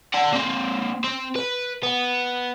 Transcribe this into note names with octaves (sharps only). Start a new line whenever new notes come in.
D5 F#5
A#3 C4
C4
B4
B3